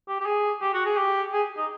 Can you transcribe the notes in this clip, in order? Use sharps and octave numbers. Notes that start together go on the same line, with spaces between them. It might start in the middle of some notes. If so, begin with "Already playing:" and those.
G4
G4
G#4
G4
F#4
G#4
G4
G#4
D#4